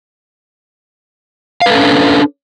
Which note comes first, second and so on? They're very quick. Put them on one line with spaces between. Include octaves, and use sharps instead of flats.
F5 B4 A4 C#4 D4